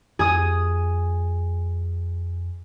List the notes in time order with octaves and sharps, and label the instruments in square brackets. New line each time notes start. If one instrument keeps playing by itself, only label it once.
[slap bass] F2 [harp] G#4 D#6